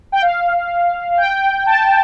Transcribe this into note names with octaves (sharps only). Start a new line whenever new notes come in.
G5
F5
G5
A5